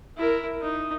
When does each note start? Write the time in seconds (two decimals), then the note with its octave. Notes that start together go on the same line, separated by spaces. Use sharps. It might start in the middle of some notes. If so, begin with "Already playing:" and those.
0.17 E4 A#4
0.61 D#4